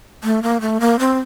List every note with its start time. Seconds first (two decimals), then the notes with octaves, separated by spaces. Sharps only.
0.24 A3
0.43 A#3
0.61 A3
0.80 A#3
0.99 C4